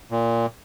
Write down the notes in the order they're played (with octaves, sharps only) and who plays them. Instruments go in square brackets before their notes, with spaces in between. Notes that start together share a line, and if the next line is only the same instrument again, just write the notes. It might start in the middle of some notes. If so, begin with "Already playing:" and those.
[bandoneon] A#2